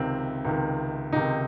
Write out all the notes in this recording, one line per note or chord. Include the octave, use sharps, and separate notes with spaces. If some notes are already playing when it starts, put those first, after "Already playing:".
Already playing: C#2 C3 D#3 C4
C#2 C3 D#3
C#2 C3 D#3 D#4